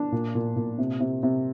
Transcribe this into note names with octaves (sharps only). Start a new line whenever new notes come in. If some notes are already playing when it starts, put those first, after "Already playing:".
Already playing: D4
A#2
A#2
A#2
C3
C3
C3